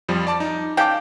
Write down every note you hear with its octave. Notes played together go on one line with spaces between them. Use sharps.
F2 F3 G3
D5 A5 D6
D#4
C#3 F5 G5 A5 D6